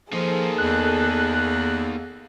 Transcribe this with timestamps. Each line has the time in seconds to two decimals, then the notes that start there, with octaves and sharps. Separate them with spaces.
0.13 F3 A#3 D#4 G#4 A4
0.58 E2 F#6